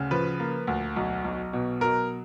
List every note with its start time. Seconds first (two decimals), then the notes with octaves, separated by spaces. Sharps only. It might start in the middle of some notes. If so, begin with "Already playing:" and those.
Already playing: D2 C#3
0.11 F3 B4
0.40 A#3
0.67 D2
0.96 B1
1.24 B1
1.53 B2
1.81 F#3 A#4